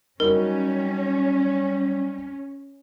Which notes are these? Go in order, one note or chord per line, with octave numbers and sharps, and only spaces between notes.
F#3 G3 C#4 D#4 F#4 A#4